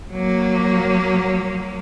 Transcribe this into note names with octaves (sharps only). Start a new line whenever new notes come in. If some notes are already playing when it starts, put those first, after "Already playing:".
F#3 A#3